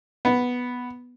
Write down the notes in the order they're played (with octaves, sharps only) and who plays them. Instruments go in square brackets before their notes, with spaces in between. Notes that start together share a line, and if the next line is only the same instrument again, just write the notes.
[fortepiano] B3